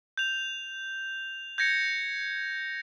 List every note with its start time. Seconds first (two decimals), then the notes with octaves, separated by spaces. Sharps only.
0.17 G6 F7
1.58 G6 G#6 A#6 C#7